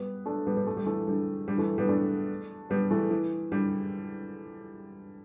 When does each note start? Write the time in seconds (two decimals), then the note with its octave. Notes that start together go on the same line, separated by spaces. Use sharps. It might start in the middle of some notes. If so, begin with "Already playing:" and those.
Already playing: G3 B3
0.26 A3 D4
0.46 G3 B3
0.57 G3 B3
0.67 A3
0.77 G3
0.86 E3 A3
1.07 D3 G3
1.48 D3 G3
1.58 E3 A3
1.78 G3 B3
1.89 A3 D4
2.70 G3 B3
2.91 E3 A3
3.10 E3
3.51 D3 G3